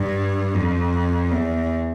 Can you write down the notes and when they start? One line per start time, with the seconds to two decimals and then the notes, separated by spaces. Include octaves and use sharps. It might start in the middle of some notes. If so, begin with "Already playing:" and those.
Already playing: G2
0.54 F2
1.31 E2